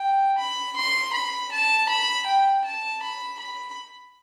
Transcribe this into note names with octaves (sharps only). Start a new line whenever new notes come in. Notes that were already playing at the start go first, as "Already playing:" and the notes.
Already playing: G5
B5
C6
B5
A5
B5
G5
A5
B5
B5